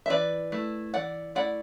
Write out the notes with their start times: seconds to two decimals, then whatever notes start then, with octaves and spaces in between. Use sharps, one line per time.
0.06 E5
0.09 E3 B4 D5
0.52 A3 E4
0.94 E3 D5 F#5
1.35 A3 E4 D5 F#5